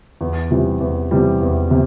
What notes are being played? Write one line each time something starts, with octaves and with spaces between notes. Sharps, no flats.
E2
C3 E3 G3
E2
C3 E3 G3
E2
C3